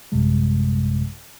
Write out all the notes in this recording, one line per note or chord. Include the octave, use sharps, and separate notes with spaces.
A1 F#2 A2 C3 G3 G#3